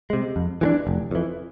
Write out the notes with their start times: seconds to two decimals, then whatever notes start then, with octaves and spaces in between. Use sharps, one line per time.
0.10 C3 G#3
0.36 F2
0.61 E3 G#3 D4
0.87 F1
1.11 F2 E3